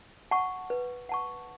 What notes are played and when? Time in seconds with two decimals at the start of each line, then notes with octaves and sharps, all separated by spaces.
0.31 F#5 A5 C#6
0.70 B4
1.09 F#5 A5 C#6